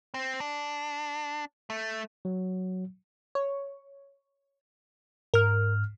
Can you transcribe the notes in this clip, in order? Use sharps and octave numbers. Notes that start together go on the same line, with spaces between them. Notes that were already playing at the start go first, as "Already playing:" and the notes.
C4
D4
A3
F#3
C#5
G#2 A#4 F6